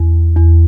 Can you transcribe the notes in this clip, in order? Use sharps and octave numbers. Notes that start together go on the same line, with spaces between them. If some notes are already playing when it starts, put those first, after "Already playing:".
Already playing: E2
E2